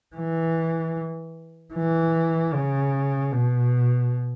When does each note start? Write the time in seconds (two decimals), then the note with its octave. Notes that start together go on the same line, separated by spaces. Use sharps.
0.16 E3
1.74 E3
2.53 C#3
3.32 B2